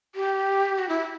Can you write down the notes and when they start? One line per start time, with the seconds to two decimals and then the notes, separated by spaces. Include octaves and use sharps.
0.15 G4
0.78 F#4
0.89 E4